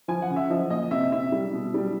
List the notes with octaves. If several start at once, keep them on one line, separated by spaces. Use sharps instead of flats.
F3 G#5
F#5
C#3
E5
F3 D#5
A#2 D#5
C3 E5
C3 E5
G3
B2
G3